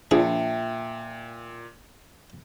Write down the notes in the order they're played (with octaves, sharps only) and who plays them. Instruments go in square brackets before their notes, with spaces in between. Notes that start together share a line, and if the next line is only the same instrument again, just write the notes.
[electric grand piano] A#2 [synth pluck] F3 D4 [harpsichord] G#4 [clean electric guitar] E5 G5 A5